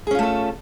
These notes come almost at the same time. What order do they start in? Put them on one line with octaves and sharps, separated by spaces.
G#4 C#4 F4 A3 A4